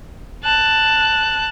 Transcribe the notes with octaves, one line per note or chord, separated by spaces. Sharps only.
A5 F#6